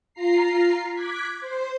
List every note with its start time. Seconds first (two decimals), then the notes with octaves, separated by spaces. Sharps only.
0.14 F4 A#5 C7
0.92 D6 F#6 G#6 B6
1.41 C5 C6